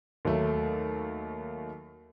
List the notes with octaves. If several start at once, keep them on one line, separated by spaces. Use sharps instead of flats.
D#2 F#3 A3